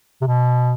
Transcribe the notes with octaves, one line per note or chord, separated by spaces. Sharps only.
C3
B2